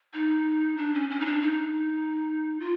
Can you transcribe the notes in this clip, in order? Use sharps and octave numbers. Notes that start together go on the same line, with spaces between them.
D#4
D4
C#4
C#4
D#4
D4
D#4
F4